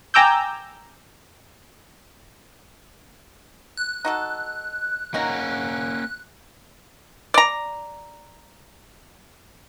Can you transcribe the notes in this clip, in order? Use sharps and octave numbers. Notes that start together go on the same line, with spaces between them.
G5 G#5 A#5 D6 E6 G6
F#6
D#4 F#4 A4
A#3 C#4 D#4 F#4 A#5
D5 A#5